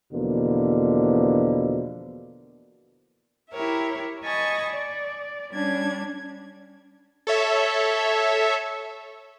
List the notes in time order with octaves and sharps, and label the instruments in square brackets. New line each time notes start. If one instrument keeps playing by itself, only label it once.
[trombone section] E2 B2 D3 F3 A#3
[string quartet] E4 G4 A#4 C#5 E5
D#5 G#5 A5 B5 C#6 D#6
D5
G3 C#4 D4 G#6
[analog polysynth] A4 C#5 E5